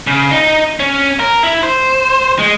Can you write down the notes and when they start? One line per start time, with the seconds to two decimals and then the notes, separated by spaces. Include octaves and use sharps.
0.07 C#3
0.31 D#4
0.80 C#4
1.20 A#4
1.43 E4
1.63 C5
2.39 G#3